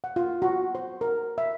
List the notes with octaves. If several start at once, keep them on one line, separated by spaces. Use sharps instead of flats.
F#5
F4
F#4
C5
A#4
E5